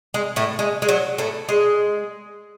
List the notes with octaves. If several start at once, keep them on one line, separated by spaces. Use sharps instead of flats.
G#3
A2 A3
G#3
G#3
F#3
A2 A3
G#3